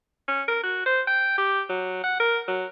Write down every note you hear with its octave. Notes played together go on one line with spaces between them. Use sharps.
C#4
A#4
F#4
C5
G5
G4
F#3
F#5
A#4
F#3